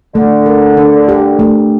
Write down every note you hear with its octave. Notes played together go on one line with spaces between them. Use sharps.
D3 A3
A#4
D4
G4
A3